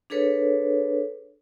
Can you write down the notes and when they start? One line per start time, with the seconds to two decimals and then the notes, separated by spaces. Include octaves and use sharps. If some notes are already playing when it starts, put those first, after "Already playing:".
0.10 D4 G#4 A4 B4 C#5